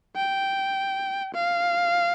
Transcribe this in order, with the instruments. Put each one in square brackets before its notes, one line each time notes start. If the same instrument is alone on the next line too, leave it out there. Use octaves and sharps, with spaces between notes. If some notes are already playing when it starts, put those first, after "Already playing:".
[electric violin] G5
F5